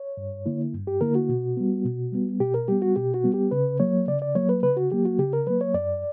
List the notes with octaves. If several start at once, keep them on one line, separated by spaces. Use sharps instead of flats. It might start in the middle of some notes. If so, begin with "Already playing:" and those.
Already playing: C#5
G2
D3 A#3 E4
G2
G4
D3 A#3 E4 A#4
F#4
B2
G3 B3
B2
G3 B3
B2 G4
A#4
G3 B3 G4
F#4
B2 G4
F#4
G3 B3
G4
C#3 B4
F#3 A#3 C#5
C#3 D5
D5
F#3 A#3 C#5
B4
C#3 B4
F#4
F#3 A#3 G4
F#4
C#3 G4
A#4
F#3 A#3 B4
C#5
F#2 D5